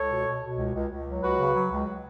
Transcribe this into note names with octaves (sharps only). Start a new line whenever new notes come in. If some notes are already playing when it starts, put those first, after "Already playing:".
Already playing: C#2 A4 C#5
B2
B2
B2
C#2
C#2
C#2
F#3
C#2 F#4 B4
C#3
F#3
C#2